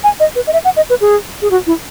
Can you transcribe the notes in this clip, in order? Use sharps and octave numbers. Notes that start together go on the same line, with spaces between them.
G#5
D#5
B4
D#5
E5
F#5
D#5
B4
G#4
G#4
F#4
E4